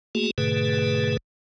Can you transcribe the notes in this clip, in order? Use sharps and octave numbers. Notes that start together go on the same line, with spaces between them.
A3 A#3 F#4 G#4
G#2 B2 D3 A3 G#4 B4